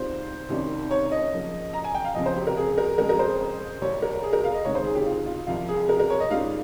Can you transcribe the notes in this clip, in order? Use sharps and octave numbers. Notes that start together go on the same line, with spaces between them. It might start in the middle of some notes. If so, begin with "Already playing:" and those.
Already playing: G#2 G3 C4 F4 C5
C2 C3 D#3 G3 C#4
C#5
D#5
C#3 F3 A#3
A#5
G#5
G5
F5
C#2 C3 F3 C4 D#5
C5
G4
A#4
G#4
A#4
F2 C#3 G#3 A#4
A#4
C5
C2 C3 G3 C4 C#5
A#4
G#4
A#4
F5
D#5
C#2 C3 D#3 G#3 C#5
C5
G#4
G4
F4
F4
C2 C3 F3 F4
G#4
A#4
A#4
C#5
D#5
G#2 G3 C#4 F4 F5